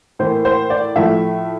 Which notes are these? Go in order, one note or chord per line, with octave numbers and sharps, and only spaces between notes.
A2 E3 A#3 C5
C5
D5
A2 F3 A3 E5